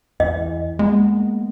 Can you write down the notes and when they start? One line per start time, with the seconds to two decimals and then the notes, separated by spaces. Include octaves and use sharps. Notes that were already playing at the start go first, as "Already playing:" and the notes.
0.20 E2 E3 D#5
0.79 G#3 A#3 B3